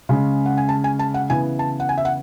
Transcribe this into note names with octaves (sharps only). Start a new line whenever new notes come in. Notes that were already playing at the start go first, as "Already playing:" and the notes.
C#3 G#3 C#4
F#5
G#5
A5
G#5
A5
F#5
C#3 E3 B3 G#5
A5
F#5
G#5
E5
F#5